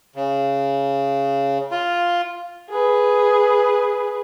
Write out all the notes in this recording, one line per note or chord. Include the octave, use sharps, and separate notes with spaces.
C#3
F4
G#4 B4